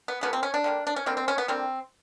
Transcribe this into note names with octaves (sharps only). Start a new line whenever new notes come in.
B3
C#3 F3 A#3 B3
C4
C#4
D4
D3 G3 A#3
D4
C#4
D3 G3 A#3 C4
C4
C#4
B3
D3 G3 A#3 C4